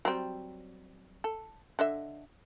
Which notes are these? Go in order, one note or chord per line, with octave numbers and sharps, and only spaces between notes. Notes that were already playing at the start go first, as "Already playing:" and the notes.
F#3 G3 C4
A4
D3 D#5 E5